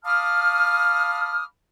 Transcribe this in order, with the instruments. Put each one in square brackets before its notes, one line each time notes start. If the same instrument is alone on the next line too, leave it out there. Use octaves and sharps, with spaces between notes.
[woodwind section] F5 A5 B5 D6 D#6 F6